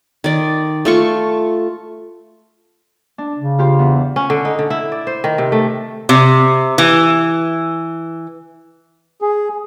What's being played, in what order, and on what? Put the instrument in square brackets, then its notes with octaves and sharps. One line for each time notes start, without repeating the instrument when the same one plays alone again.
[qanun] D#3 D5
A3 F4 C#6
[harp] D4
[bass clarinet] C#3
[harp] F4 G4 C5
E2
[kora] C#4
D3
D#4
D3
E4
D5
C5
D#3
C3
A3
[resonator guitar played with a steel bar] C3
E3
[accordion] G#4